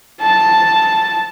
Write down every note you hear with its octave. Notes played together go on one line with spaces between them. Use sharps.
A5